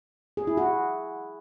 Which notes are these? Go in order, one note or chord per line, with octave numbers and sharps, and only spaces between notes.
G#4
E4
F#4